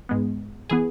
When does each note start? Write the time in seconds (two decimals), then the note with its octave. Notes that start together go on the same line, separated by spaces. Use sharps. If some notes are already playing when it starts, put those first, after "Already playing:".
0.09 G#2 G#3 B3
0.70 E3 B3 G#4